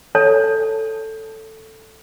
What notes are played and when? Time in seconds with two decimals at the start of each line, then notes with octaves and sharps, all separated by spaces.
0.15 A4 C#5 A5